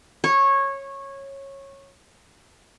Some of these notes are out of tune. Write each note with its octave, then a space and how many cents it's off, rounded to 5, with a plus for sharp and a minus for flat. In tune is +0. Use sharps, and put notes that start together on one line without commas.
C#5 -15